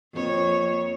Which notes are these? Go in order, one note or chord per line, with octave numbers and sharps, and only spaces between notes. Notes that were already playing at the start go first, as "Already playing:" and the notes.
F2 A#3 C#5